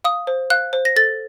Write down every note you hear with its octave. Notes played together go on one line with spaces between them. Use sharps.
F5 D#6
C5
F5 F#6
C5
A#6
A4 A6